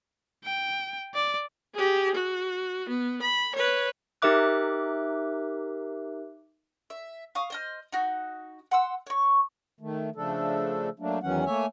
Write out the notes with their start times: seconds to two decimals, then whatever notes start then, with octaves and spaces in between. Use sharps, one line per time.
0.44 G5
1.15 D5
1.74 G4 G#4
2.15 F#4
2.89 B3
3.22 B5
3.55 B4 C#5
4.22 D#4 G4 A#4 E5 D6 F#6
6.90 E5
7.35 F5 C#6 D#6
7.50 C5 D#5 F6
7.92 D#4 F#4
8.71 F#5 C6 E6
9.07 C#5 C#6
9.81 D#3 A3
10.16 C#3 F3 A3 D4 A4
11.00 F#3 A3 A#3 D4
11.23 E2 D#3 E3 F#3 C#4 F#5
11.46 A3 A#3 C#5 E5 G#5